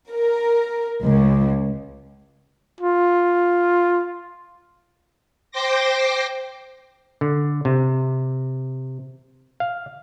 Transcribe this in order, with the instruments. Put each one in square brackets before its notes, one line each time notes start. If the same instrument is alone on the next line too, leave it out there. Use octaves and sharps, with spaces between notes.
[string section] A#4
C#2
[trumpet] F4
[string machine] C5 G5 C6 D6 A#6
[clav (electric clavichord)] D3
C3
F5